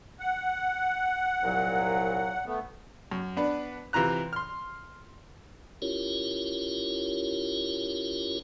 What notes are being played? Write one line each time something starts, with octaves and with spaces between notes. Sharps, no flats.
F#5
C2 A#2 F#3
A3 B3
F#2
B3 D4 B4
C3 E3 F4 A#5 F#6
C6 F6
C#4 E4 F4 G4 A#4 C#5